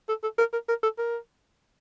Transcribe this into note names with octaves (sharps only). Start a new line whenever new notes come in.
A4
A4
A#4
A#4
A#4
A4
A#4